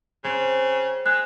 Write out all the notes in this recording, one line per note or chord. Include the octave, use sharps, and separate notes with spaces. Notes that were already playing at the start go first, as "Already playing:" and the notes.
C#3 C4
G#3 F#6